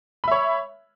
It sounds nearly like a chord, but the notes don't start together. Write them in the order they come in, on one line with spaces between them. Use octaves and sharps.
B5 E5 C#5